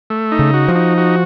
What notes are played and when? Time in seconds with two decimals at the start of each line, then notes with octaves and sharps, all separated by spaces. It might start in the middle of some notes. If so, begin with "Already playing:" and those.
0.10 A3
0.32 D#4
0.39 C#3
0.54 F#4
0.68 F3
0.75 D#4
0.98 F#4